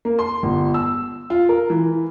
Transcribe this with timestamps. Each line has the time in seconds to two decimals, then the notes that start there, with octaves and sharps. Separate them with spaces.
0.05 A#3
0.19 C6
0.43 G1
0.74 E6
1.30 F4
1.49 A#4
1.70 E3